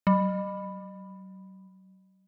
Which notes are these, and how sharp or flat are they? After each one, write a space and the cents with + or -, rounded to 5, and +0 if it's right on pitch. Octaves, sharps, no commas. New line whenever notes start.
F#3 +40